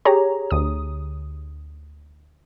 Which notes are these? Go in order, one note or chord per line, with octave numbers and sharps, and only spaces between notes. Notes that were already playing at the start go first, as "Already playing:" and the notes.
G4 G#4 C#5 A#5
D2 D#6